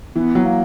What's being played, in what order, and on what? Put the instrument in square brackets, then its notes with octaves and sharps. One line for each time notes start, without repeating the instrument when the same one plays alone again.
[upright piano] E3 [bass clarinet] B3
[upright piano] F#3
[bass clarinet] A#3